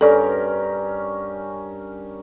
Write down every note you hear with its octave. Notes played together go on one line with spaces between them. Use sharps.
G2 C#4 A4 A#4 D5